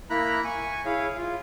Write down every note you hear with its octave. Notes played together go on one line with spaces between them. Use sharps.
A#3 E4 A#5 B5 F#6
G#5 C#6
E4 G#4 C#5 F5
F4